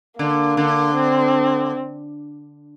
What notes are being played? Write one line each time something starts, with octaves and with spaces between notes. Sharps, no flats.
D3 A#3
D3
C4